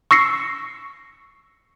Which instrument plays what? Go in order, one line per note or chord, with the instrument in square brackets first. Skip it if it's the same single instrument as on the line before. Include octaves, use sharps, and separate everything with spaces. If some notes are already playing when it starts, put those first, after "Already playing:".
[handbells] C#6 E6 A#6 C7 C#7